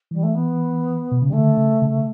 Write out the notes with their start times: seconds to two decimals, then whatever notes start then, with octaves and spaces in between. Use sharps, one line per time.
0.11 E3 G3
0.23 A3
0.35 B3
1.12 B2
1.22 C#3
1.28 G3
1.32 D3 A3
1.57 C#3
1.82 C#3